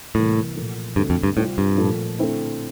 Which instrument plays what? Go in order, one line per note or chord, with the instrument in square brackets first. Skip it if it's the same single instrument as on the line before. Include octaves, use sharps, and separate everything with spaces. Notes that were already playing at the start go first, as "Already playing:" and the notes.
[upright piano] C2 C3 E3 A#3 [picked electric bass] A2
[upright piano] A#2 F3 A3
[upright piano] D2 D3 A3 C4 [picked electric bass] G2
[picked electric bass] F2
G2
[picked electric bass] A2 [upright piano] C3 G3 C4 F4
[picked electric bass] G2
[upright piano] A#2 F3 A3
D3 A3 C4 E4